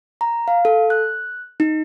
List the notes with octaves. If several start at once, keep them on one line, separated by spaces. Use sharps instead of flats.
A#5
F5
A4
F#6
D#4